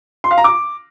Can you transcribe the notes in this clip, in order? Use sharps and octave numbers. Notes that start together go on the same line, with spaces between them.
C6
F5
A#5
D6